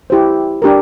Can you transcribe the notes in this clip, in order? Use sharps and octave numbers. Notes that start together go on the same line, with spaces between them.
E4 G4 C5
D4 G4 A#4